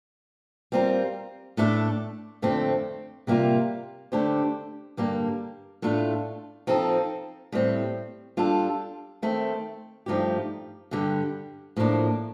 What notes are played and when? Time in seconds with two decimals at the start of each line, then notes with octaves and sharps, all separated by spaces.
0.72 G3 C4 F4 A#4
1.57 A2 A3 D4 A4
2.42 F2 D3 A3 C4
3.27 C3 G3 A#3 F4
4.12 D3 A3 D4 G4 C5
4.97 G2 D3 G3 A#3
5.82 A2 A3 D4 F4
6.67 F3 C4 D#4 A4
7.52 A2 G3 C4
8.37 G3 D4 F4 A4
9.22 D#3 A3 C4
10.06 G2 F3 A3 D#4 G4
10.91 G2 D3 G3
11.77 A2 F3 A#3 D4